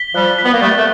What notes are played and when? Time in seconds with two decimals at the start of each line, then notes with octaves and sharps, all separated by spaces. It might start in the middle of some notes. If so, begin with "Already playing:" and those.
Already playing: B6 G7
0.15 F3 G3 F#6
0.39 B6
0.45 B3
0.53 A#3
0.61 G3 A3 A6
0.78 A3